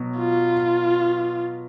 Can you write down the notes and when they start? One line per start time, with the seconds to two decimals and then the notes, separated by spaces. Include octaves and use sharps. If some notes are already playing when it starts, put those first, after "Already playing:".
Already playing: B2 F#3
0.19 F4